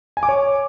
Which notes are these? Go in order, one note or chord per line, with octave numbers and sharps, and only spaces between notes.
G#5
D6
C#5